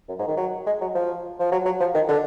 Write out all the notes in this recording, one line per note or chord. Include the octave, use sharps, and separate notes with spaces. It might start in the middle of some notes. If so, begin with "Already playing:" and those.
F#2
G#2
D#3
F#3
G#3
F#3
F3
F3
F#3
F#3
F3
D#3
D3